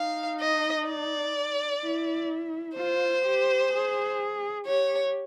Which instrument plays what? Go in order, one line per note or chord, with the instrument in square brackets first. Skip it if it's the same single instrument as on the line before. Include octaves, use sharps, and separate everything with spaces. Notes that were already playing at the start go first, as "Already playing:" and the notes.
Already playing: [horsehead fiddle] D#4 [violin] F5
[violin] D#5
D5
[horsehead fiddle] E4
[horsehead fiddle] F4 [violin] C5
[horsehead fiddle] G4
G#4
[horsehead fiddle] G4 [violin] C#5